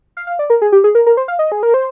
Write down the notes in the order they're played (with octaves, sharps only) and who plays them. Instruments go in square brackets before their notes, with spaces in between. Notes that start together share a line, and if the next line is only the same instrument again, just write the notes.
[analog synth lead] F5
F5
D5
A#4
G#4
G4
G#4
A#4
A#4
C5
F5
D#5
G#4
A#4
C5